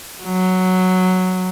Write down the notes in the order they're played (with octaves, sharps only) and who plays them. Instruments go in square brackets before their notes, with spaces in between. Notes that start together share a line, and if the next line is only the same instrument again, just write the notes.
[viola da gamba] F#3